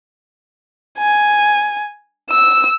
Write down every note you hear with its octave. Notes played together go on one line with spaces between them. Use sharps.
G#5
E6